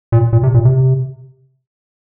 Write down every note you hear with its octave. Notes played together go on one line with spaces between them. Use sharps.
A#2
A#2
C3
A#2
C3